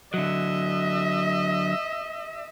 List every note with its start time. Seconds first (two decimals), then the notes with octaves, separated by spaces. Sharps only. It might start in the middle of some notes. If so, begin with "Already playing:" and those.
0.14 D3 F#3 D#5 E5